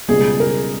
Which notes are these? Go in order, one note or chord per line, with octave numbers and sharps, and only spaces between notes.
C#2 B2 G3 G#4
A#4